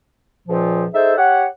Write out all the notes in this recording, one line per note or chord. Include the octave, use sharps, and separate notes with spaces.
C#2 A#2 F3
D#4 G#4 A4 C5 E5
G4 C#5 F#5